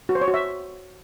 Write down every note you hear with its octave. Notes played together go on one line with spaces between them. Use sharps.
F#4
C5
C#5
F#4
E5